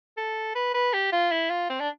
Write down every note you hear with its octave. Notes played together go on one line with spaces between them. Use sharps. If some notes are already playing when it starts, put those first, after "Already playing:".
A4
B4
B4
G4
F4
E4
F4
C4
D4